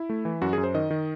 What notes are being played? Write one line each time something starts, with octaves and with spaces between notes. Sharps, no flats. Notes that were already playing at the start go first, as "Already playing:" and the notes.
Already playing: E4
A3
E3
F#2 F#4
G#4
F#2
C5
D#3 D#5
D#3